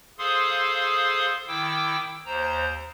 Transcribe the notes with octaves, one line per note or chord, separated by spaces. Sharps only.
G#4 A4 C5 F5 C6 D#6
D#3 E4 G5 D6 E6
D#2 C5 A#5